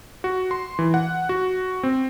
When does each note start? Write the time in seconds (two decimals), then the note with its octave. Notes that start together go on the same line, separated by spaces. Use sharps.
0.24 F#4
0.51 C6
0.79 E3
0.94 F#5
1.29 F#4
1.83 C4